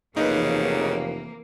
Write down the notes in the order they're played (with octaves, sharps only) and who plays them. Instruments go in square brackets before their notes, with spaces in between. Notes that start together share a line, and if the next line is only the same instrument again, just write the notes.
[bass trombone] F1 [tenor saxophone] C#3 [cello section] E3 A#3 [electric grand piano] D#4 B4